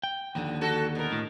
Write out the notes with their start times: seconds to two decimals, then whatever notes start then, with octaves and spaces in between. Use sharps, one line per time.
0.03 G5
0.35 D#2 D3 F3
0.61 F#4 A4
0.95 B2 A#4
1.12 A2